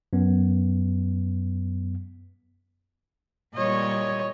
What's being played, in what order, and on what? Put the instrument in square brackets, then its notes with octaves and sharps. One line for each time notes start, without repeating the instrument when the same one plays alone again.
[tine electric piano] F#2 B3
[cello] A#2 G3 [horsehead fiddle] C#5 D#5